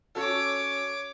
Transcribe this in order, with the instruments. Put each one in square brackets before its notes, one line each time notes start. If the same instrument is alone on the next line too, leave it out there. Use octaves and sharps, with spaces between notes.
[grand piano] C#4 F#4 A4 [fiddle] C#5 D6